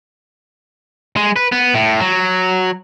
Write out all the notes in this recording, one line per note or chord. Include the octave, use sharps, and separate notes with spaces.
G#3
B4
B3
A2
F#3